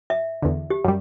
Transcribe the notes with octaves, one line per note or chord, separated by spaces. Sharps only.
E5
E2 D3
G4
F#2 G3